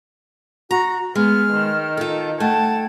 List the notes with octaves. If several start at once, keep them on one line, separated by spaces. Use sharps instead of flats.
F#4 A#5
G#3 B3 F6
D#3
F4 A4
A3 F#5 G5 A5 G#6